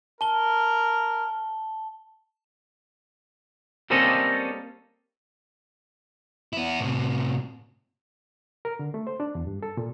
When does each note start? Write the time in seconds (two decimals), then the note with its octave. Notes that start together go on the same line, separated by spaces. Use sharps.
0.21 A#4 A5 G7
3.90 G3 A#3 C4 C#4 A4 D#5
6.53 B3 E4
6.80 A2 C3
8.65 A#4
8.79 D3
8.94 A3
9.07 C5
9.20 D4
9.35 E2
9.47 G2
9.63 A4
9.77 A#2